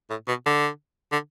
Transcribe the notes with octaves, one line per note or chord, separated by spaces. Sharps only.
A2
B2
D3
D3